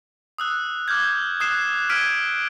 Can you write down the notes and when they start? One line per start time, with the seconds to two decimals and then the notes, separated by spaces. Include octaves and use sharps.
0.38 D#6 E6 F#6
0.88 D6 F6 G6 G#6
1.40 D#6 F#6 C7 E7
1.89 E6 F6 G#6 B6 D7 D#7